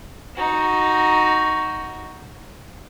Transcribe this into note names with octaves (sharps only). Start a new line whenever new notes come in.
D#4 F#4